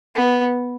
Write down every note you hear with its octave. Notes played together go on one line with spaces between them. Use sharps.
B3